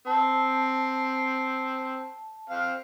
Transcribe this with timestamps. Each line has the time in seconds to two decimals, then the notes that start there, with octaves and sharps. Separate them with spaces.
0.07 C4 A5
2.50 C4 F5